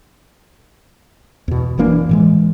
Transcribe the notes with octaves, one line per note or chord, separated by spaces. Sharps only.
E2 B2
F#1 E3 A#3 D4
A2 E3 G#3